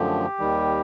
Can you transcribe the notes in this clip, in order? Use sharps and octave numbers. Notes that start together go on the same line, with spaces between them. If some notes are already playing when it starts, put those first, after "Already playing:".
Already playing: F#2 D3 F3 A3 G4
D#2 D#3 G3